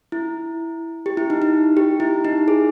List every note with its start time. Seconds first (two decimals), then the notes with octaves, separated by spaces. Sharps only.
0.12 E4
1.06 G4
1.17 E4
1.30 D#4
1.42 D#4
1.77 G4
2.00 E4
2.25 D#4
2.48 G#4